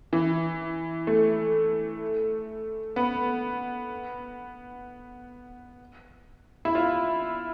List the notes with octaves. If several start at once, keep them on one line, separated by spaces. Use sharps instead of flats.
E3
A3
B3
E4
F4